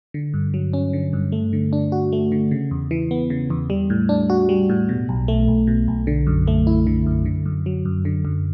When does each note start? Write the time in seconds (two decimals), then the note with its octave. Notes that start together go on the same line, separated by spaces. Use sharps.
0.14 D3
0.34 G2
0.54 F#3
0.73 C#4
0.93 D3
1.13 G2
1.32 A3
1.53 D3
1.73 D4
1.92 F#4
2.13 A3
2.32 D3
2.51 C#3
2.71 E2
2.91 E3
3.11 B3
3.30 C#3
3.50 E2
3.70 G3
3.90 A2
4.09 D4
4.30 F#4
4.49 G3
4.70 A2
4.89 B2
5.09 B1
5.28 A3
5.48 B1
5.67 B2
5.88 B1
6.07 D3
6.27 F#2
6.47 A3
6.67 E4
6.87 D3
7.06 F#2
7.26 D3
7.46 F#2
7.66 F#3
7.85 F#2
8.05 D3
8.25 F#2